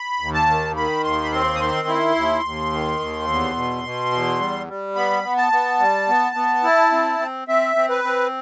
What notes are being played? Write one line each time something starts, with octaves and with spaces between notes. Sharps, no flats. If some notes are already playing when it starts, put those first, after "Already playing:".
Already playing: B5
D#2
A5
D#3
D#3 B5
D#2 C6
B5
C4 C6
D#6
D#3 C6
E4
D#2
D#2
D#3
D#2
E2
B2
B2
E2
G3
G3
B3 B5
B3
A5
B3
G3
B3
B3
E4
C4
C4
C4 E5
C4
B4
C4